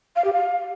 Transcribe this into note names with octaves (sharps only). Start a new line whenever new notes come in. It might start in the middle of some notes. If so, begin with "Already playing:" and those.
F5
G4
F5